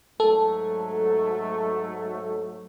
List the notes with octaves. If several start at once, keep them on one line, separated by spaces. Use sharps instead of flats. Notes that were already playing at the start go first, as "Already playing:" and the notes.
G#2 F#3 A3 A4